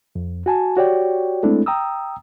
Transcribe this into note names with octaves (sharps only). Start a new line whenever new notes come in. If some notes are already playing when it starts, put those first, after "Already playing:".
F2
F#4 G#5 A5
F#4 G4 C#5 D5 G5
G#3 A3 C4 D4 E4 A4
G5 A#5 D#6 E6